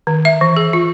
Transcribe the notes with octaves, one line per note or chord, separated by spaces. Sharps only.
D#3
E5
E3
G#4
F4